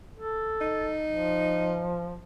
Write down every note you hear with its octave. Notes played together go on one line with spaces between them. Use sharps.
A4
D#4
F3